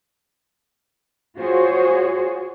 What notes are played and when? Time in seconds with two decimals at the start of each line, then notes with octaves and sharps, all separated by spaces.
1.37 F4 F#4 G#4 C5 C#5